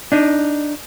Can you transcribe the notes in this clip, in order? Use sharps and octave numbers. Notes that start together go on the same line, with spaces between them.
D4 D#4